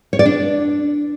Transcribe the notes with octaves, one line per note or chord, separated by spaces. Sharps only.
C#5
D5
D4